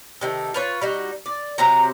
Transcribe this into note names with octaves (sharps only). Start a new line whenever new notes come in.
C3 D#3 A3
F4 B4 C#5
G3 D#4 F#4
D5
C3 F#3 C4 A#5